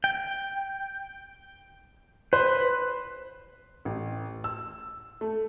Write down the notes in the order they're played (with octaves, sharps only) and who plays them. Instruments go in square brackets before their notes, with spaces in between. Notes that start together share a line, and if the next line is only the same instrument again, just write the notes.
[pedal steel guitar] G5
[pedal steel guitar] B4 [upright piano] C5
[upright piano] A1
E6
A3